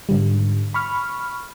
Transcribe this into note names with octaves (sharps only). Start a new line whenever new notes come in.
G#2 D3 G3
B5 C#6 F6